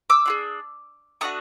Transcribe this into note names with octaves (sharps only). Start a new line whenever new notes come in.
D6 E6
D4 F4 G#4
A3 D4 F#4 C#6 D#6